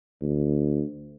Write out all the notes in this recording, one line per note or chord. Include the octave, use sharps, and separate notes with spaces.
D2